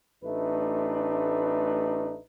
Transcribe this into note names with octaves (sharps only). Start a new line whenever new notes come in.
A1 A3 D4 D#4 B4